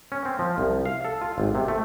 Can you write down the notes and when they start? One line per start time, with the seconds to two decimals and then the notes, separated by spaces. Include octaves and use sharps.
0.12 C#4
0.25 C4
0.39 F3
0.58 C2
0.86 F5
1.05 A4
1.21 F4
1.38 G#1
1.55 C3
1.68 A3